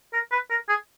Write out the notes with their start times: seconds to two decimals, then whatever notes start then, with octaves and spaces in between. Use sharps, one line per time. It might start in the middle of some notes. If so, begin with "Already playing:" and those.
0.13 A#4
0.32 B4
0.50 A#4
0.69 G#4